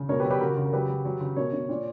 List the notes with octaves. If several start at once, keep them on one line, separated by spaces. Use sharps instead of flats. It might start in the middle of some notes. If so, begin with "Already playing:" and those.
Already playing: C#3
B2 A#4 C#5
G4 B4
F#3
G4 B4
C#3 F#4 A#4
C#3
A#4
F#3 G4 B4
F#3
F#3
C#3
B2 A#4 C#5
B2
A#2